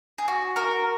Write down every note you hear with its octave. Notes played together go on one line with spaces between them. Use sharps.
G#4
F#4
F#4 A#4